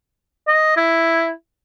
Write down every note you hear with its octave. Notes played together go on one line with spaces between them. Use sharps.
D#5
E4